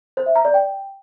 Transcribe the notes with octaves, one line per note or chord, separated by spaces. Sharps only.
C5
E5
A#5
D5
G5